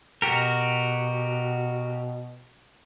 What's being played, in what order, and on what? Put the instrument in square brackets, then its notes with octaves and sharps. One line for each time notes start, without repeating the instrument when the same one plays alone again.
[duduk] B2 [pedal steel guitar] F#4 G4 A#4